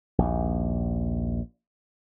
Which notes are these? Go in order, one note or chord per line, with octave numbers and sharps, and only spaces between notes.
A#1 D#2